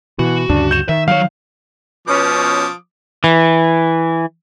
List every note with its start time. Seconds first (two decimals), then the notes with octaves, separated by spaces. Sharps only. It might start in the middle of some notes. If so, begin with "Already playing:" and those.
0.19 B2 E3 F#4
0.49 D2 G2 C#3 D4
0.71 G6 E7
0.89 D#3 E5
1.08 F#3 C#5 F5
2.08 B2 F3 C#4 D6 D#6
3.24 E3